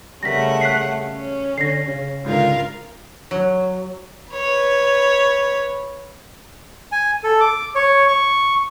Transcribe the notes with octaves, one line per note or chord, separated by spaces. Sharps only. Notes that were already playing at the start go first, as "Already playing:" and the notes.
C#3 G3 A3 A#4 F#5 A#6 B6
F#6 B6 C7
C#4
D3 A#6 C7
C#3
C#2 G#2 D3 F4 A#4 F5
F#3
B4 C#5
G#5
A4
D6
C#5
C#6